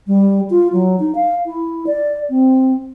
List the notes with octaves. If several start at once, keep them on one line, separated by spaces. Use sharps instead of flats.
G3
F4
F#3
D#4
F5
E4
D5
C4